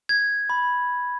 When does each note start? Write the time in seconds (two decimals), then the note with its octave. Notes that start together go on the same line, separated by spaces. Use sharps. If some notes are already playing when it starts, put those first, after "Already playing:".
0.09 G#6
0.50 B5